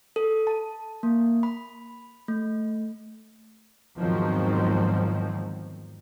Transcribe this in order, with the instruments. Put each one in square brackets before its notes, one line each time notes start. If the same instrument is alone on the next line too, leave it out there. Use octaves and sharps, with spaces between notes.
[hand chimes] A4
A5
A#3
B5
A3
[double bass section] E2 G#2 D#3 F3 F#3 C4